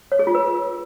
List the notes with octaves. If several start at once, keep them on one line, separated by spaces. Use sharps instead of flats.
C#5
G#4
F4
B4